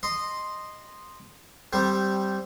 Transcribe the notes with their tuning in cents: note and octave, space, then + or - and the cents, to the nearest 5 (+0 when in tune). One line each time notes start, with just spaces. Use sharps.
D#5 -10 C6 +0
G3 -10 C4 +0